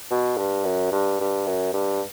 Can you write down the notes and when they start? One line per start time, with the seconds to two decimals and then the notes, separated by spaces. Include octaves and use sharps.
0.11 B2
0.37 G2
0.64 F#2
0.92 G2
1.20 G2
1.46 F#2
1.73 G2